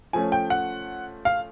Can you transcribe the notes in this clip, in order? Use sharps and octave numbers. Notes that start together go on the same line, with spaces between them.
F3 A3 C#4 G#5
G5
F#5
F5